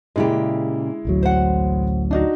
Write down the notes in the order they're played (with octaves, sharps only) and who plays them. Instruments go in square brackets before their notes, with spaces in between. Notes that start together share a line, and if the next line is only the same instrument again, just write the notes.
[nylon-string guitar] A#2 C#3 G4 [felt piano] G#3 E4
[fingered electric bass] A1 D2 F#3
[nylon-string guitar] C5 F#5
[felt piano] D4 D#4 F#4